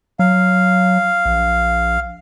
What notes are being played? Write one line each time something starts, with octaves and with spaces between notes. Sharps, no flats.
F#3 F5
A#1